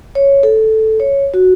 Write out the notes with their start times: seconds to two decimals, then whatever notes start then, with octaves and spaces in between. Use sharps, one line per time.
0.15 C#5
0.43 A4
1.00 C#5
1.34 F#4